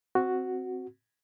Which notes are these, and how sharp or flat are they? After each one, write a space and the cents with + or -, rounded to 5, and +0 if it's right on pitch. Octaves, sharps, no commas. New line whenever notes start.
C4 -5 F#4 +0